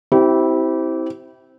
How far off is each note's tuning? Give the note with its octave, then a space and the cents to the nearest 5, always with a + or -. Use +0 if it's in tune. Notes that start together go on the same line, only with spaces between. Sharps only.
C4 +0 E4 -15 G4 -30